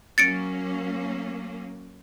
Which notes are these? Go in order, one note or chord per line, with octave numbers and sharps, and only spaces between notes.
F#3 A#3 C#4 A6 C#7 D7